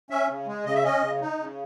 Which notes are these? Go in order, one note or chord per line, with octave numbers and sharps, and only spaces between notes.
C#4 E5
C#3
G#3
C#3 D#5
E5
C#4 D#5
C#3
D#4
C#3